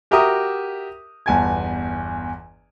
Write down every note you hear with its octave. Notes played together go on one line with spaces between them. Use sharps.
F#4 G4 A#4 E5 A#5 D#6
G1 E2 G#5 A5 G#6